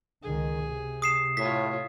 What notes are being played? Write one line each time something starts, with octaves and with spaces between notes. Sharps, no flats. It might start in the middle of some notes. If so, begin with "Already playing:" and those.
C#2 D#3 G#4
C3
D#6 C7 E7
A2 F4 C#5 B6